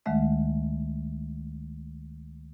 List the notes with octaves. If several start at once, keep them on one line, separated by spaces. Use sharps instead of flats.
D2 D#3 G#3 A3 E5